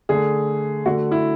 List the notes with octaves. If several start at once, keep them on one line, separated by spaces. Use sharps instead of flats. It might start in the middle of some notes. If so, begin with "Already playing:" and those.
D3 A3 G#4
D3 A3 F#4
E4